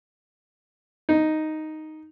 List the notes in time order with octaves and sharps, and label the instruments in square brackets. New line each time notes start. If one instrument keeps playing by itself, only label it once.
[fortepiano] D#4